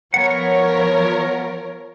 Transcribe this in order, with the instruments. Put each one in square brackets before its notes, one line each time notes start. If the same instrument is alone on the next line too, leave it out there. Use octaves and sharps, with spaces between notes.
[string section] F3 A#4 C#5 [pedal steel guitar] B3 F#5